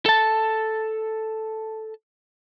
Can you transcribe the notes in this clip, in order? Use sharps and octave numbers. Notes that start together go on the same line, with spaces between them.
A4 A5